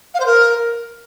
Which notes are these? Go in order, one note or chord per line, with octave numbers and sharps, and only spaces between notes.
F5
C5
A#4